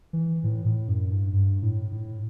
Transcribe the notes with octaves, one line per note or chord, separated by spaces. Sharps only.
E3
A2
A2
F#2
G2
G2
A2
A2